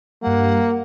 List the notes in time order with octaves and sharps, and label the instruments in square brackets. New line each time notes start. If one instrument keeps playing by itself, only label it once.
[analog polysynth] G2 G3 [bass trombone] A#3 [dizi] F#5